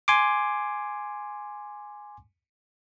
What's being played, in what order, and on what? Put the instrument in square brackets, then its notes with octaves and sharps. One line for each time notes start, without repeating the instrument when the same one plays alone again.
[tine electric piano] G#5 C6 D6